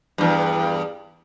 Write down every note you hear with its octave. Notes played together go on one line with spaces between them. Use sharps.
E2 G2